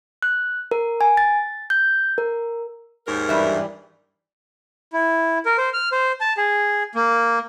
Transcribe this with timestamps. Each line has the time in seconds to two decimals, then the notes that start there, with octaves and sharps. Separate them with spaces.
0.22 F#6
0.71 A#4
1.01 G#5
1.17 A6
1.70 G6
2.18 A#4
3.07 D#2 G#2 A#4
3.29 G2 E3 G3 E5
4.93 E4
5.45 A#4
5.58 C5
5.73 F6
5.92 C5
6.21 A5
6.37 G#4
6.95 A#3